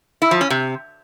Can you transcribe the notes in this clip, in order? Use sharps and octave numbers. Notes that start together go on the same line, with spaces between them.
E4
F3
C#4
C3